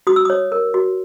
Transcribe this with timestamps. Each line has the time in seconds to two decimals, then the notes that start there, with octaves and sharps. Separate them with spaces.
0.07 F#4 D#6
0.16 E6
0.25 C#5 D#6
0.52 A#4
0.74 F#4